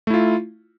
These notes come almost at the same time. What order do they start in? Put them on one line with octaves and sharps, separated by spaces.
A3 E4 F4